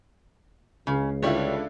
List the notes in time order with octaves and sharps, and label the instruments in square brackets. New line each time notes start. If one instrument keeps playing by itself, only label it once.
[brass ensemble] C#2 [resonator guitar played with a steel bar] C#3
[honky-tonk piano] D3 E4 F4 [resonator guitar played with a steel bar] G3 C#5